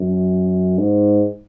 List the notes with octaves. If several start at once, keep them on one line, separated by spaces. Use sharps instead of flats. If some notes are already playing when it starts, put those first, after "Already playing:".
Already playing: F#2
G#2